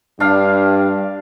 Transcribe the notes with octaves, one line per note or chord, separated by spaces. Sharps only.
G2 G3 D4 F5